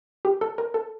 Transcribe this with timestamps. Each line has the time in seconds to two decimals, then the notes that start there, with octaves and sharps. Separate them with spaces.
0.25 G4
0.41 A4
0.58 A#4
0.74 A4